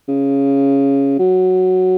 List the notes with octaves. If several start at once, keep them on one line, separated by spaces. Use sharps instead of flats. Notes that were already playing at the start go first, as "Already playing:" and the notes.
C#3
F#3